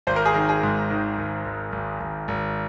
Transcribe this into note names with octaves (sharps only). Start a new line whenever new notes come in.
G#1 C5
A#4
G#4
D#3 A#4
G#4
G#2
D#3
G#1
G#1
G#1
G#1
G#1